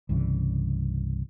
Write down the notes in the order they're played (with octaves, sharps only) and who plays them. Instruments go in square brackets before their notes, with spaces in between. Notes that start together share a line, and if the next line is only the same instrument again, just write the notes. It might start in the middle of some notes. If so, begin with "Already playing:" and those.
[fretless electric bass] C2 G2 C#3 E3